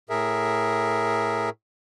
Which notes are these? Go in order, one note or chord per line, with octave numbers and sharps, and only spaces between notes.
A2 G#4 A#4 E5